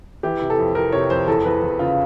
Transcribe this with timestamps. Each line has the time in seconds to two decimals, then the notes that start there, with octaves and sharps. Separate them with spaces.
0.23 E3 G4
0.42 C3
0.50 A4
0.59 F2
0.75 C3 A#4
0.92 C3 C#5
1.10 F2 C5
1.28 E2 A4
1.45 E2 B4
1.62 E2
1.79 C#3 F4